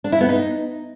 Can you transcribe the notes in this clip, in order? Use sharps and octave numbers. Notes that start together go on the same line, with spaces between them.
D4
E4
B3
D#4